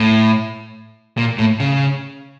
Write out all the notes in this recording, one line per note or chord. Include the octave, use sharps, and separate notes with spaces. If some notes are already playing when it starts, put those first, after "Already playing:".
Already playing: A2
A#2
A2
C#3